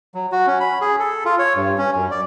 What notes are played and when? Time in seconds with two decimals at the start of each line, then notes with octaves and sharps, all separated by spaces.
0.15 F#3
0.32 F#4
0.47 C#4
0.60 B5
0.81 G#4
0.99 A4
1.25 F4
1.39 C#5
1.56 G2
1.78 C#4
1.96 F#2
2.11 D5